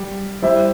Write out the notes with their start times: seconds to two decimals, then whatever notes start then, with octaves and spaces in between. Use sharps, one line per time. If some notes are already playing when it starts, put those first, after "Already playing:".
Already playing: G3
0.42 G3 E4 C5 E5